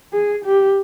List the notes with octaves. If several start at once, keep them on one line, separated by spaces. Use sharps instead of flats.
G#4
G4